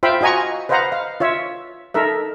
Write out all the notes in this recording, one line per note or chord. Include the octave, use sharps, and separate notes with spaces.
F4 C5 E5 F5 G5 B5
F4 F#4 D#5 G#5 A#5 C#6
B4 C5 D#5 F5 F#5 A#5
F5
F4 C#5 E5
D#4 A4 A#4 E5